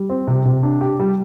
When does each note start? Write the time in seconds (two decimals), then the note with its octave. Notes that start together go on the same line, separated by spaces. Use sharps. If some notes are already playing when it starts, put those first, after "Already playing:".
Already playing: G3
0.10 C4
0.28 C3
0.45 C3
0.63 D4
0.81 G4
0.99 G3